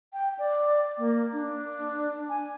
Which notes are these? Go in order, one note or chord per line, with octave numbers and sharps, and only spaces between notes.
G5
D5
A#3
D4
G#5